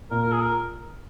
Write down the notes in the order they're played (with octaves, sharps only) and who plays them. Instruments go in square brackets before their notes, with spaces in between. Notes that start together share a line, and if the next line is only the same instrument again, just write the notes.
[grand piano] A#2 [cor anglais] A#4
[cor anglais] A#4
[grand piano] F4
[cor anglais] G#4
A#4